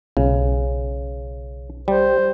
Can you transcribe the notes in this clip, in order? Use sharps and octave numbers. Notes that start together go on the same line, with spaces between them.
B1 C#3
G3 C5